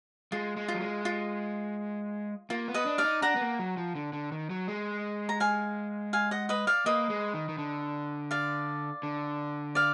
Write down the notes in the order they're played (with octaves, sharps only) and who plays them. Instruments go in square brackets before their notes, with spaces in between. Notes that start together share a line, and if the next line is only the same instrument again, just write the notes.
[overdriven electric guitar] G#3 [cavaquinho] F4
[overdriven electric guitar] G#3
[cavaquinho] F4
[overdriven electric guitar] F#3
G#3
[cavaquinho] F4
[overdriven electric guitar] A#3 [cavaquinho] F4
[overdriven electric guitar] B3
[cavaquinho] B4 D#5
[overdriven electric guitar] D4
[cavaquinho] D5 F5
[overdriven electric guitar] D#4
[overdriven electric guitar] D4 [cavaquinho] F#5 A#5
[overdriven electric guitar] B3
A#3
F#3
F3
D3
D3
D#3
F#3
G#3
[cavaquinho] A#5
F5 G#5
F5 G#5
D#5 F#5
B4 D#5
D5 F5
[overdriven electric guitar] A#3 [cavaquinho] B4 D#5
[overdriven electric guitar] G#3
D#3
D#3
D3
[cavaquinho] D5 F5
[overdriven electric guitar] D3
[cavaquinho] D5 F5